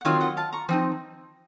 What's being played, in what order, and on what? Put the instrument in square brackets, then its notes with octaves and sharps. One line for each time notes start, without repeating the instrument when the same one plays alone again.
[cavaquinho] F#5
[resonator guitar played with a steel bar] D#3 F#3 C4 F4 [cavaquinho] C#5 F5
[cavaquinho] D#5 F#5
F5 A5
A#5 C#6
[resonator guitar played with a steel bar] F3 C4 D#4